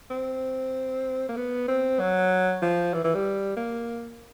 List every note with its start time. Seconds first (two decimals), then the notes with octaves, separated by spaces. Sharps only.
0.11 C4
1.29 A#3
1.37 B3
1.68 C4
2.00 F#3
2.62 F3
2.94 E3
3.04 E3
3.15 G3
3.57 A#3